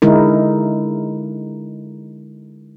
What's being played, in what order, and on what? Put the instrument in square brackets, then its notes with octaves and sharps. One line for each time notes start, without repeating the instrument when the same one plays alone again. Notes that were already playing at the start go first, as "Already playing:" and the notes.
[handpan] D3 G#3 D#4 E4 A#4